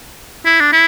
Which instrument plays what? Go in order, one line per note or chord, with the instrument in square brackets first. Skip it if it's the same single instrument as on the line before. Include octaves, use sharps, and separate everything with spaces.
[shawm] E4
D4
E4